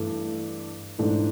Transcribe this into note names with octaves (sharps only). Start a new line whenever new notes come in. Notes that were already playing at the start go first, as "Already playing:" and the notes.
Already playing: G2 E3 A3
G#2 E3 A3 D4